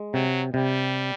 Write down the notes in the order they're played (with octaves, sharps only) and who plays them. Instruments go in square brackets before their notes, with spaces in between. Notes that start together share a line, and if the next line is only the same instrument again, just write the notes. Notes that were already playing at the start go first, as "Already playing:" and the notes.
Already playing: [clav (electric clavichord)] G#3
[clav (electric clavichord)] C3 [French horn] F#3
[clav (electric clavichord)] C3 [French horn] G3